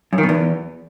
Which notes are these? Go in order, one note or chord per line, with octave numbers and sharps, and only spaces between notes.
F#2
D#3
B2
E2